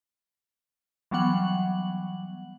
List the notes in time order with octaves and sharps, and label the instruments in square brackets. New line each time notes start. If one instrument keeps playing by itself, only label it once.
[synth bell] E3 F#3 G3 B3 F#5 F#7